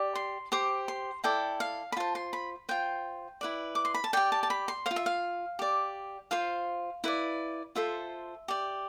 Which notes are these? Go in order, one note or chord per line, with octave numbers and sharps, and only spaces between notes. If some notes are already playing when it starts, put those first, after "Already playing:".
Already playing: G4 D5
C6
G4 C5 D6
C6
E4 A4 D5 G5
F5
B5
F4 C5 A5
C6
B5
F4 C5 G5
E4 B4 D5
D6
C6
B5
A5
G4 D5 G5
A5
A5
B5
C6
C5 F5
F4
E5
F5
G4 D5
F4 C5 F5
E4 B4 D5
F4 A4 C5 E5
G4 D5